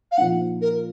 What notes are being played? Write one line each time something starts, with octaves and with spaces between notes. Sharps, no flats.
F5
A#2 F3 C4 D#4 F#5
A#4